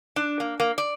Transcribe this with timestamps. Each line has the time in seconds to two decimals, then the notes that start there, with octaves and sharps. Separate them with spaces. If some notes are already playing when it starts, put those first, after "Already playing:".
0.16 D4
0.40 A#3
0.60 A#3
0.78 D5